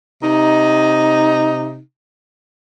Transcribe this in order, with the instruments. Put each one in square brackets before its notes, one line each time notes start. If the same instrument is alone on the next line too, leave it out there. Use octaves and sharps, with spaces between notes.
[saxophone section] C3 D#4